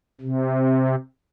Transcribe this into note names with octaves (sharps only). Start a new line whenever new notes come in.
C3